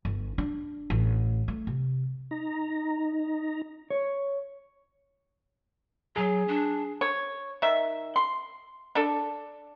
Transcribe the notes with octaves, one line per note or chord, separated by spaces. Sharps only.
G1
D4
A1
A3
C3
D#4 A#5
C#5
F#3 G#4
D4
C#5
D#3 E5
C6
D4 A4